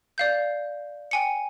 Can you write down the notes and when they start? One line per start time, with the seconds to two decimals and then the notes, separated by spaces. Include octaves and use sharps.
0.18 D5 F5 G6
1.11 G5 G#5 C#7